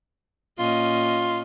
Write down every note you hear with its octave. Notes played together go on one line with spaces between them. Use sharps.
A#2 C#4 F4 D#5